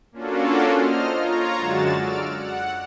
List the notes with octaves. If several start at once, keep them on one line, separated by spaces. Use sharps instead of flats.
A#3 C#4 D4 F4 F#4 A4
C5 D#5 F6
F4 C#5 A#5
F#2 D3 G#3 F#4 A6 E7
D5 E6 F6 D7
F#5